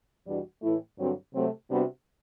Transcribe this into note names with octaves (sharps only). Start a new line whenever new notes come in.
E2 B2 G3 D4 F#4
A2 E3 A3 E4
G2 D3 F#3 C4 F#4
C3 F#3 A3 C4
C3 G3 B3 D4 F#4